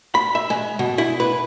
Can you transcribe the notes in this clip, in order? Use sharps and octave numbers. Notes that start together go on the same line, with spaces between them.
B5
E5
G#3
B2
E4
B4